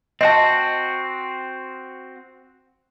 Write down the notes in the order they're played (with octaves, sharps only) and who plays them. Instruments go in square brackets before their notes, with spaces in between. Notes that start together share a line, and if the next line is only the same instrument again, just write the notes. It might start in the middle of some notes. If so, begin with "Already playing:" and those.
[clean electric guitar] C4 F#4 [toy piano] D#5 A5